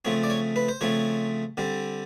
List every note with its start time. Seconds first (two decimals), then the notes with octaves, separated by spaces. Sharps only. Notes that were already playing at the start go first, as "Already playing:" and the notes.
0.05 C#3 F3 A3 C4 C#5
0.23 D5
0.30 C#5
0.56 B4
0.69 C5
0.81 C#3 F3 A3 C4 C#5
1.57 D3 G3 C4